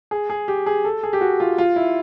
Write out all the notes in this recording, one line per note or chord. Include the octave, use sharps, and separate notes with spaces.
G#4
G#4
G4
G#4
A4
G#4
G4
F#4
F4
F4
E4